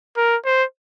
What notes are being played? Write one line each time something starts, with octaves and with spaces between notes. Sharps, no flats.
A#4
C5